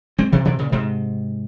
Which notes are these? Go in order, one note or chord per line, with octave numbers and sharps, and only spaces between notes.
G#3 C4
C3 E3
C3 E3
A#2 C#3
G#2 C3